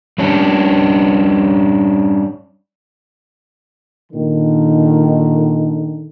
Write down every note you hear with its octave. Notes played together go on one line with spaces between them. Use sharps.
G3 C#4 D4
A#2 D3 D#3